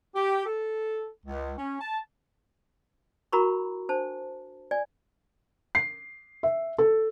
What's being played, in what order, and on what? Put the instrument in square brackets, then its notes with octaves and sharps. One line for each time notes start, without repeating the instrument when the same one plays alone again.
[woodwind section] G4
A4
C#2
C#4
A5
[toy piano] E4 F#4 A#4 A#5 B5 C#6
D4 C5 A5
D5 G#5
[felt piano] C7
E5
A4